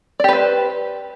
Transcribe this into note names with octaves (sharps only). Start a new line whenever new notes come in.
G4 B4 C5 D5